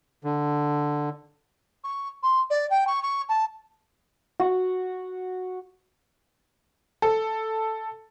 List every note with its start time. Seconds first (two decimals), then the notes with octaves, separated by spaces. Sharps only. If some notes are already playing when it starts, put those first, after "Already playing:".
0.24 D3
1.84 C#6
2.23 C6
2.50 D5
2.70 G5
2.87 C#6
3.03 C#6
3.29 A5
4.40 F#4
7.02 A4